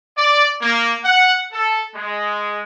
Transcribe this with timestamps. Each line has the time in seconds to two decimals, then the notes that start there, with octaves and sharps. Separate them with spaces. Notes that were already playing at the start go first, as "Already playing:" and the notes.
0.17 D5
0.61 A#3
1.04 F#5
1.53 A4
1.95 G#3